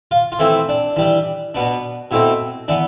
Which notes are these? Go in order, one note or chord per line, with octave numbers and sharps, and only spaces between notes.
F4
F4
E3 A3 C4 E4
D4
E3 G3 D4
B2 B3 D4
B2 A3 C4 E4
E3 B3 D4